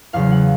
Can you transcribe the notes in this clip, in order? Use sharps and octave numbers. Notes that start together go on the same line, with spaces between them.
E2 C#3 F#3 F5
F#5